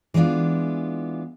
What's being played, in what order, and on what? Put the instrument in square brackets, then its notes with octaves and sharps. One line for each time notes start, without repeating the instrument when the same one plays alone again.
[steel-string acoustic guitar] E3 G#3 B3 D4 F4